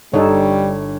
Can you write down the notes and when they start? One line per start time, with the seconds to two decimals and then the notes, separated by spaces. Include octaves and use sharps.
0.14 G1 D3 G3 D#4 A4 C#5